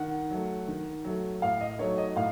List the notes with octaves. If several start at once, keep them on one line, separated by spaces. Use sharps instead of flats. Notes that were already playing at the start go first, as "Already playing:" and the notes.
Already playing: D#3 F#5
F#3 A3
D#3
F#3 A3
A2 F5
D#5
F#3 A3 D#4 C#5
D#5
A2 F5